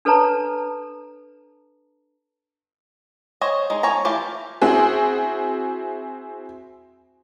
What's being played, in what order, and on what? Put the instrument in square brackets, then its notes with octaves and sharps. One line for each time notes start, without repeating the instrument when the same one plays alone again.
[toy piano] D4 A4 B4 C#5 A5 A#5
[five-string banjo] C5 C#5 D#5
G#3 D#4
F3 C#5 G#5 A#5
E3 A3 F4 G4
[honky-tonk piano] C4 E4 F#4 G#4